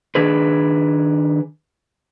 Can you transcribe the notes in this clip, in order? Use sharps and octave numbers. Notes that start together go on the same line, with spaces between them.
D#3 D4 G#4 B4